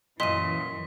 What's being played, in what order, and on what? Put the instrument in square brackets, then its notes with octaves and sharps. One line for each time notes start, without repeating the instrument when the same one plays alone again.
[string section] F#2 E3 [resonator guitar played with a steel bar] A#2 D#5 [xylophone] C6 D#7 [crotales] B6